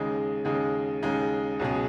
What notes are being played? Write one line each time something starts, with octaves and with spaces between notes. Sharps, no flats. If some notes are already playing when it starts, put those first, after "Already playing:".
Already playing: D#2 C#3 G#3 D#4 G#4
D#2 C#3 G#3 D#4 G#4
D#2 C#3 G#3 D#4 G#4
C#2 B2 F#3 C#4 G#4